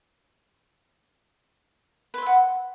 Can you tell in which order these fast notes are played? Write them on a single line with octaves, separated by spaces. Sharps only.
B4 C5 E5 F#5